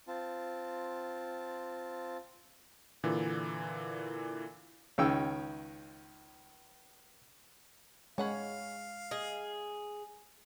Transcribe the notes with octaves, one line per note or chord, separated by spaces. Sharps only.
C4 F4 A5
A#2 D3 E3
C#2 D#3 C#4 G5 E6
G#3 C#4 C#5 F5 F#5 B5
G#4 D#5